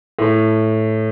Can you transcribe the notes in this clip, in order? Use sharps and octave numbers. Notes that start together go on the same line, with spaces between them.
A2